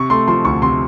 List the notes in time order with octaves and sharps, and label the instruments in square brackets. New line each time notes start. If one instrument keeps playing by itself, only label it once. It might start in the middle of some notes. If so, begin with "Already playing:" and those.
Already playing: [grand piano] C3 C#6
A3 C6
F3 C6
D2 C#6
C3 C6